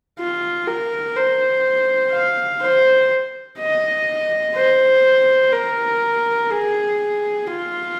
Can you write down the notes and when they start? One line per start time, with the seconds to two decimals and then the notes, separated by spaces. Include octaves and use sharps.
0.19 F4
0.67 A#4
1.16 C5
2.13 F5
2.61 C5
3.59 D#5
4.55 C5
5.52 A#4
6.50 G#4
7.47 F4